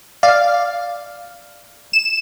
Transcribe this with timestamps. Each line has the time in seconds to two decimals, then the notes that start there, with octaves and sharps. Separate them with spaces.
0.23 D5 F5
1.93 E7